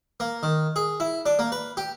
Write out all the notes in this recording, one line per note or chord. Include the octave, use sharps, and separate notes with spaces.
A#3
D#3
G#4
E4
D4
A#3
B4
G4